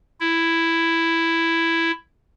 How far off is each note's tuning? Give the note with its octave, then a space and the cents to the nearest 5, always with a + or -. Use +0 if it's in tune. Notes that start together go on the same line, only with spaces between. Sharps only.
E4 +5